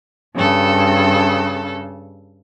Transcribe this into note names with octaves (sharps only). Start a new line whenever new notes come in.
G2 C#3 A4